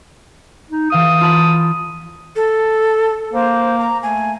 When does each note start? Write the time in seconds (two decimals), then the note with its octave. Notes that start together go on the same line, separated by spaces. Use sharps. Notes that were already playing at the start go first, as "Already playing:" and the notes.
0.70 D#4
0.90 E3 F5 D#6 D#7
1.21 F4 A5 B5
2.36 A4
3.33 A#3 C5
3.79 A#5
4.03 A3 G#5